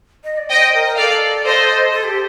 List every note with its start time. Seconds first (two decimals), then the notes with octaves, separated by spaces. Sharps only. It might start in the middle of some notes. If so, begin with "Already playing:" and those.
0.24 D#5
0.38 D5
0.50 C5 D#5 G5
0.74 A#4
0.87 A#4
0.97 A4 D5 F5
1.45 C5 D#5
1.92 A4
2.04 G4